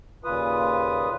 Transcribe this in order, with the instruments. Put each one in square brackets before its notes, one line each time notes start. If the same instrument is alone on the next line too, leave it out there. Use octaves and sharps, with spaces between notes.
[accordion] D#2 A#2 C#3 F4 B4 D#6